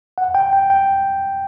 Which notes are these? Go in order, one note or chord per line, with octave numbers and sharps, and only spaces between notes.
F#5
G5
G5
G5